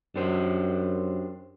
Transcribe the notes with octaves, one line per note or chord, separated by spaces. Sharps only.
F#2 D4 G4 C5